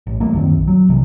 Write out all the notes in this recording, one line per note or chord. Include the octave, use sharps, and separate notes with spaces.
A1
E3 G3 A3 A#3
C#2 F#2 D#3 C4
A#1
F#3
C2 C3 E3